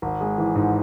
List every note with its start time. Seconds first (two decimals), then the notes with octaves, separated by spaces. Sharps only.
0.02 G#1
0.21 G#3
0.38 E3
0.56 G#2